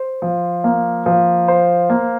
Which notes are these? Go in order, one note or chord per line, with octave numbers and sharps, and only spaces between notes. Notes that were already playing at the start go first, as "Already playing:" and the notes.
Already playing: C5
F3
A#3
F3
C5
A#3